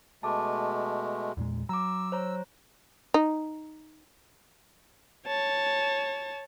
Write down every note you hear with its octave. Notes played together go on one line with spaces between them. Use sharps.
B2 G#3 A3 A5 D6
E2 A#2 G#3
F#3 A#5 D6 E6
C5 C#5 A#5
D#4
C#5 A5